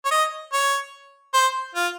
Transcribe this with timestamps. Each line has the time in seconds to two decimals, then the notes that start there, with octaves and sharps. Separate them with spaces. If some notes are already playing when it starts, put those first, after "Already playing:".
0.05 C#5
0.11 D#5
0.53 C#5
1.34 C5
1.75 F4